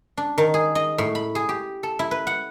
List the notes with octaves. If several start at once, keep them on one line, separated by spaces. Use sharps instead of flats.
D4
D#3
G#4
D#5
A2
B5
G#4
G4
A4
E4
B4
F#5